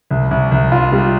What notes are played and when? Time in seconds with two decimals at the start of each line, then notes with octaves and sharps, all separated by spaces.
0.11 C2
0.31 C2
0.52 C2
0.72 F4
0.92 G3